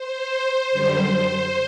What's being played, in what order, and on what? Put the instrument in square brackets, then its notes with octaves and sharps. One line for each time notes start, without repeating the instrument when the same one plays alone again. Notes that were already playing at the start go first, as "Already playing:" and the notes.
Already playing: [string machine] C5
F#2 D3 G3